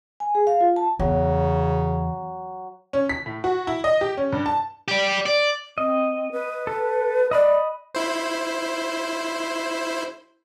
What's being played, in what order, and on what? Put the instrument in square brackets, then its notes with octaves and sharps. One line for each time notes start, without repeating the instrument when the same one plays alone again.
[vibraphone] G#5
G#4
F5
F4
A5
[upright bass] E2 [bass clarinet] C#3 [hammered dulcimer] F#3
[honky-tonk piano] C#4
B6
A2
F#4
E4
D#5
G4
C#4
G2
A5
[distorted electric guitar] G4 D5
D5
[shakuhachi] C4 [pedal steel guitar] D#5
[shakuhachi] B4
[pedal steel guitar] A4
[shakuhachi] D5 [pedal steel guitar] D#5 B5 F#6
[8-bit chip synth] E4 C5